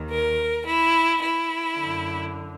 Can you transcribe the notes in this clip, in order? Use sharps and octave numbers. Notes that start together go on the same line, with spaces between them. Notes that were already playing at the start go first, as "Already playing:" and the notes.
Already playing: D#2 D#3
A#4
E4
E4
F#2 D3